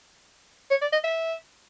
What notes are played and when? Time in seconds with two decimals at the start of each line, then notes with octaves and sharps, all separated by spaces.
0.71 C#5
0.81 D5
0.93 D#5
1.04 E5